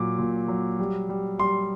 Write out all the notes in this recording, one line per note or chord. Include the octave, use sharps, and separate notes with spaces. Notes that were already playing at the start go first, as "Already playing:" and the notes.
Already playing: A#2 F#3 D6
A#2
F#3
G3
G3
G3 C6